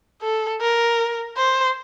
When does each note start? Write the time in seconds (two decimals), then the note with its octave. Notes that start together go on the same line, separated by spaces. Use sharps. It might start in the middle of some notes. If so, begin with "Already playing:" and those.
0.22 A4
0.61 A#4
1.37 C5